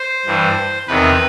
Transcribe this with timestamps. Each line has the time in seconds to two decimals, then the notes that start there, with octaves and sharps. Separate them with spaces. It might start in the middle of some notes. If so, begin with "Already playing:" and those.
Already playing: C5
0.26 G2 E3
0.87 E2 C3 D#3 B4